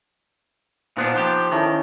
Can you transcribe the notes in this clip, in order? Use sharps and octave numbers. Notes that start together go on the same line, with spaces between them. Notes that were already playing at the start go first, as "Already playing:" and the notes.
A#2 B3 D4 D#4 C5
F3 G4
D#3 C#4 E4 A4